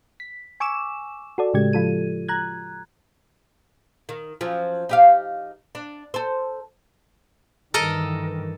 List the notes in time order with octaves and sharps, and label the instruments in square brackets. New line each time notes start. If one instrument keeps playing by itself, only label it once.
[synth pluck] B6
G#5 C#6 D6 E6 E7
F#4 A4 D5
A2 C#3 G#3 G4 G#6
F3 F4 A4 D#7
A#5 F#6 G#6
[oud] D#3
F3 F#3 C#4
D#4 G4 F5
D4
A4 C5
[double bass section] G2 D#3 E3 [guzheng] A4 A#4 D#5